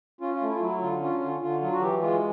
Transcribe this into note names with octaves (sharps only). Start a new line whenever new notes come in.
C#4 F4
F4
A3
E4
F4
F#3 E4
D3 F4
C#4 F4
D3 F4
D3 F4
F#3 F4
F#4
E3 G4
G#3 F4